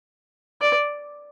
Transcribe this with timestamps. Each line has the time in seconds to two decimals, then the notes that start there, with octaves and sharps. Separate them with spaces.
0.61 D5